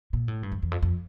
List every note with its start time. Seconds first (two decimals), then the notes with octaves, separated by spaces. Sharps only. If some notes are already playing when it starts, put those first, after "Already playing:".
0.13 A#2
0.28 A2
0.43 G2
0.52 F2
0.63 E2
0.71 F2
0.82 F2